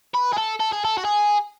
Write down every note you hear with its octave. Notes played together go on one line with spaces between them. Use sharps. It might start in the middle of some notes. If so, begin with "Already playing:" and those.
B4
G#4
A4
A4
G#4
A4
F#4
G#4